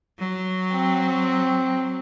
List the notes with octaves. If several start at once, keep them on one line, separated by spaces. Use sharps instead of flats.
F#3
C4